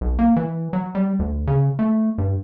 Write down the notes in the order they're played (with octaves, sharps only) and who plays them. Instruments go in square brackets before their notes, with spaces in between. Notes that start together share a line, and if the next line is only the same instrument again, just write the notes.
[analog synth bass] B1
A#3
E3
F#3
G3
D2
C#3
A3
G2